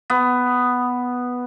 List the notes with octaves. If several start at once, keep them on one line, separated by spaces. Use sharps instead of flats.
B3